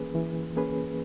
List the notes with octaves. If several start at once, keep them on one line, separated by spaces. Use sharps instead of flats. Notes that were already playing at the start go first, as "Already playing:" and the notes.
Already playing: E3 A#3 C#4 G#4 B4
E3
A#3 C#4 G#4 B4